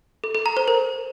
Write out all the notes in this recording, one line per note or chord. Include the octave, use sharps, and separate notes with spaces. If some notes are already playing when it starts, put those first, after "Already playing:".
A4
A4
A#5
C5
A#4